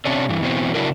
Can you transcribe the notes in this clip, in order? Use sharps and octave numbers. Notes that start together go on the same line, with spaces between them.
C3 C#4 D4
G2 E3
E2 B2 E3 C4
C#3 F#3 D4 E4 F#4 A#4